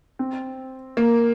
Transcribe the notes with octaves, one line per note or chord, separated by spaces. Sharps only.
C4
A#3